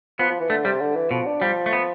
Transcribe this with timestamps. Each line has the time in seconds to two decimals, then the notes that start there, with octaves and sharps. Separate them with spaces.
0.19 F3 B3
0.29 F3
0.40 E3
0.50 D3 A3
0.65 C3 G3
0.80 D3
0.96 E3
1.11 B2 F3
1.26 D4
1.42 F3 G3
1.66 A3
1.73 B3